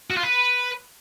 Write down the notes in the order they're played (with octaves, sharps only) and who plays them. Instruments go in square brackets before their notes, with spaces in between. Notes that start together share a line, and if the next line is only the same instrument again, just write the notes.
[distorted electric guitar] F#4
F4
B4